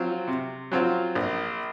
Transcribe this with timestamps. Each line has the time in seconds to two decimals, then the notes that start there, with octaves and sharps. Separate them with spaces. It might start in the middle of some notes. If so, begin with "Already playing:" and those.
Already playing: F#3 C4 F4
0.28 C3
0.72 F#3 C4 F4
1.15 A#1